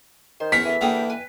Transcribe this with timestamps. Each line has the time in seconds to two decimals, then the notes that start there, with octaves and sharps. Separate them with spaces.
0.40 D#3 C5
0.52 E2 A#4 C#6 B6
0.65 E3 A4 E5 G#5
0.81 D3 G3 A#3 G#4 G5
1.10 B4 G#5